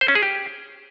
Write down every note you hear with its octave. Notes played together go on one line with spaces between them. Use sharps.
C5
C#4
G#4
G4